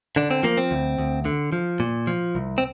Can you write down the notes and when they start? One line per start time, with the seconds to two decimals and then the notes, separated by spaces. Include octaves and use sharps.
0.16 D3 D4
0.31 C4
0.43 F3 A#3
0.57 C4
0.71 D2
0.98 D2
1.25 D3
1.52 F3
1.80 A#2
2.07 F3
2.35 C2
2.58 C4